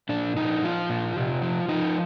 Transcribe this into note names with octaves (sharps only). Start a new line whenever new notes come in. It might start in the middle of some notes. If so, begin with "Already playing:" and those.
A#2 D4
F3 D#4
F3 F4
A#2
C3
F3
F3 D#4